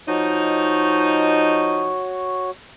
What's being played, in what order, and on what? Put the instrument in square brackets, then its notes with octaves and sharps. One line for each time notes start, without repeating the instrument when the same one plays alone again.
[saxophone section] F3 D#4 [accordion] F#4 C#5